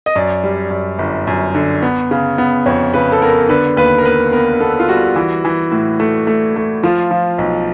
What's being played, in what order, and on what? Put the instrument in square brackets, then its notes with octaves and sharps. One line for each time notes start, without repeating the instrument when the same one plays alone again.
[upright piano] D#5
[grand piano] F#2 [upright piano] D5
[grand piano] G3
F#2
G1
F#2
D3
B3
C#3
B3
[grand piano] F2 [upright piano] C#5
[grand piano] C#3 [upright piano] B4
[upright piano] A4
[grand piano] B3 [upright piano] A#4
[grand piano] D3 [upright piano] B4
[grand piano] D#2 [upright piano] B4
[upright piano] A#4
[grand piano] B3 [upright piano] B4
[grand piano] B3 [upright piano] A#4
[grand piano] B3 [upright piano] A4
[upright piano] F4
[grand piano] G3 [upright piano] F#4
[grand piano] E3
E3
A2
A3
A3
A3
[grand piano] F3 [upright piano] F4
[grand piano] F3
B1